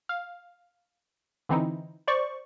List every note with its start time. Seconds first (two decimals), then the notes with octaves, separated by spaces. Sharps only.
0.09 F5
1.49 D3 E3 C4 D#4 E4
2.07 C5 D5 C#6